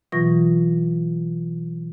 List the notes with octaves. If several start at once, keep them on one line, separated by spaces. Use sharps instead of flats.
B2 E3 F#3 F4 C#6 A#6